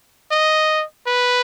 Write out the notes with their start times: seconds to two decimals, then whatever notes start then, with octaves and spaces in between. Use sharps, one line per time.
0.31 D#5
1.06 B4